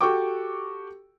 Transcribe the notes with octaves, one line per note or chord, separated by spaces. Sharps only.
F#4 G4 A4 G5 C#6 D6